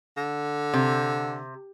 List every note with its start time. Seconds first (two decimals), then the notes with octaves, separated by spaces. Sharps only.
0.17 D3
0.74 C3